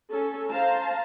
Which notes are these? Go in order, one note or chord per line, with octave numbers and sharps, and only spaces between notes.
C#4 A4
C5 F5 A5 A#5